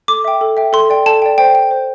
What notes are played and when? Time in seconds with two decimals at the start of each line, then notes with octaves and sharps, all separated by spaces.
0.08 A4 D6
0.24 E5 G5
0.41 A4
0.57 E5 G5
0.73 A4 C6
0.90 D5 G5
1.06 A4 A5
1.22 D5 G5
1.38 C5 G5
1.55 G5
1.71 C5